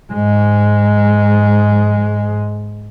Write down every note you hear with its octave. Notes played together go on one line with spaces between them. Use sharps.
G#2 G#3